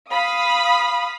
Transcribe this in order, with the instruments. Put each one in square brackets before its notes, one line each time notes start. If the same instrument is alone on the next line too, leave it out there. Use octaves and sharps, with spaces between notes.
[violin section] F5 B5 D#6